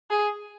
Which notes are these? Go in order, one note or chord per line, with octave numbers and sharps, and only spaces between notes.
G#4